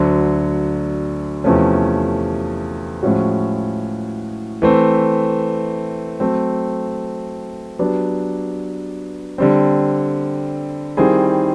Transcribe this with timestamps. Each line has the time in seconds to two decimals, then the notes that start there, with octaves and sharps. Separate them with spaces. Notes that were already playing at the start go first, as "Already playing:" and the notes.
Already playing: D2 D3 F#3
1.44 E2 C3 F3 A3 C#4
3.03 A2 F3 G#3 C#4 F#4
4.62 E3 A3 C4
6.20 F#3 A3 C4
7.79 F#3 B3 D4 G4
9.38 D3 G3 C4
10.97 D#3 G3 C4 E4 G#4